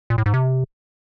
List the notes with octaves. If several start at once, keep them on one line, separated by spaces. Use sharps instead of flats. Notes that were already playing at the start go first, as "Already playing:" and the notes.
A#2
A2
G#2
C3